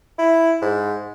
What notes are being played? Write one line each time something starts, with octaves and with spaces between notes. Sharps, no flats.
E4
G#2